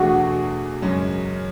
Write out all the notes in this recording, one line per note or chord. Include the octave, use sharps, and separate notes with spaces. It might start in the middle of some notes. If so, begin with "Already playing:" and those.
Already playing: E2 B2 A3 D4 F#4 G#4
F#2 C#3 G#3 C#4